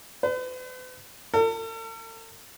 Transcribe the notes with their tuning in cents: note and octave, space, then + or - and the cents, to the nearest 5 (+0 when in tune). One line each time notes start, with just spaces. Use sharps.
B4 +45
A4 +45